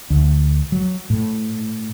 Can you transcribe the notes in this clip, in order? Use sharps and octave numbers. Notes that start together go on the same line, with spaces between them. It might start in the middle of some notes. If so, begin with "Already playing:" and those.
D2
F#3
A2